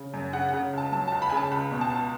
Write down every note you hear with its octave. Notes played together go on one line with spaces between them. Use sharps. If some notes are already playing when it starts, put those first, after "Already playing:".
Already playing: C#3
F#2
C#3 F#5
C#3 F#5
C#2 A5
F#3 A5
C#2 A5
B5
G#5
C#3 A5
C#2 B5
B2
A5
C#2